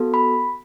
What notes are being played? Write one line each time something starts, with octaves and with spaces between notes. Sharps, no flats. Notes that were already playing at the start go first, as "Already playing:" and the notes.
Already playing: B3 F#4 A4
B5